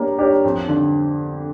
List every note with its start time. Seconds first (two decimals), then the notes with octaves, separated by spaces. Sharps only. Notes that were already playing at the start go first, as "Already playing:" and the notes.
Already playing: A#3 D4 G4 A#4 C#5
0.19 D4 G4 A#4 C#5
0.44 F2
0.68 D3